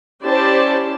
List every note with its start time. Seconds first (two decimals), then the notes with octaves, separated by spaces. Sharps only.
0.22 C#4 E4 G4 C5 D5 A5